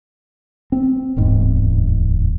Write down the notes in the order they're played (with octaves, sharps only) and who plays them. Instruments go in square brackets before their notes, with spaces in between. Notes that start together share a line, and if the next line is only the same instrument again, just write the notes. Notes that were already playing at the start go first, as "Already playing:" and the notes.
[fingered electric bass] C4
D1 E2 G#2